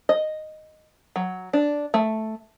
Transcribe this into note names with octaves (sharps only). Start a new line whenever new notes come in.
D#5
F#3
D4
A3